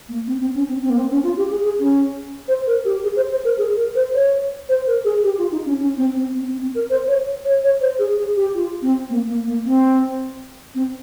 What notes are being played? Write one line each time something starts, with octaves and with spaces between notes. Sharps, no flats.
A#3
C4
C4
C#4
C4
C4
A#3
C4
C#4
F4
G4
G#4
G#4
C#4
C5
A#4
G4
G#4
C5
C5
A#4
G#4
A#4
C5
C#5
C5
A#4
G#4
G4
F4
D#4
C#4
C#4
C4
C4
C4
C4
C4
A#4
C5
C#5
C#5
C#5
C5
G#4
G#4
G4
F4
C4
A#3
A#3
A#3
C4
C4